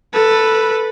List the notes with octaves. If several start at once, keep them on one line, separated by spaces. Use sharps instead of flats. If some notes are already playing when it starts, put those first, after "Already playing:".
A4 B4